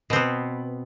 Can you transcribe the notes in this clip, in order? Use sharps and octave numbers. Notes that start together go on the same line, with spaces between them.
B2 B3 C4